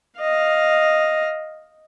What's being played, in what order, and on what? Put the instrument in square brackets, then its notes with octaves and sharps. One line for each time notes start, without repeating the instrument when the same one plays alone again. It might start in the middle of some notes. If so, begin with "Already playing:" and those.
[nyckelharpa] D#5 F5